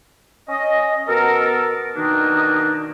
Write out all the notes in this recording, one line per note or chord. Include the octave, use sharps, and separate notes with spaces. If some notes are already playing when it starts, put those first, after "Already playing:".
C#4 D#5
B2 B3 A4 A#4
B2 D#3 A#3 D4 D#4